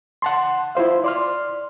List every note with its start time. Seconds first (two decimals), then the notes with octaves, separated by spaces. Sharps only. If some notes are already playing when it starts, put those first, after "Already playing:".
0.22 F#5 A5 C6
0.75 E4 F4 C5 F5
1.04 D5 C6 F6